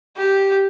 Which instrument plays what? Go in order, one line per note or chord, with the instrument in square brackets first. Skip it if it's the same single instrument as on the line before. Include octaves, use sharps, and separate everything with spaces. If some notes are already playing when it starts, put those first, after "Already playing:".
[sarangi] G4